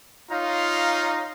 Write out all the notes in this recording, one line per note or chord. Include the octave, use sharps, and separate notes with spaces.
D#4 F4 C#5 F5 A#5